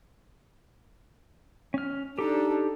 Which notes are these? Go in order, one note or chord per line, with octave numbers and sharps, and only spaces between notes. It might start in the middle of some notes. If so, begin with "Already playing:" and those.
C#4 F6
D4 D#4 G4 A4